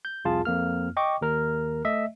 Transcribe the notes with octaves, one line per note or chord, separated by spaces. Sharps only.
G6
C2 F2 F4 G#4 A5
F2 A#3 F6
D#5 G5 C#6 D6
D#2 A#4 F6
A3 D#5 E5